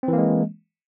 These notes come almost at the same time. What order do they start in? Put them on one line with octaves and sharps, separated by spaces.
C4 E3 A#3 G#3